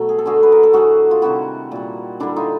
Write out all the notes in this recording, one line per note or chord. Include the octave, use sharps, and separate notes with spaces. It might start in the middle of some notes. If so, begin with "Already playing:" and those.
Already playing: B2 F#3 A3
G#4
A4
D3 F#3 A3 F#4 G#4
B4
A#4
A4
A2 F#3 A3 F#4 G#4
F4
C3 D#3 G3 E4 F#4
A#2 G3
D3 G3 D4 E4
D#4 F4